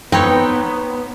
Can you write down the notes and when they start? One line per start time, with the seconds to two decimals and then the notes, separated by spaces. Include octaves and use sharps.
0.12 B3 C4 D#4 B4 C#5 G5